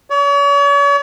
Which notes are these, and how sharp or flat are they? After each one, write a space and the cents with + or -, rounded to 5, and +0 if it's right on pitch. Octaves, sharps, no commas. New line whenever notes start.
C#5 +40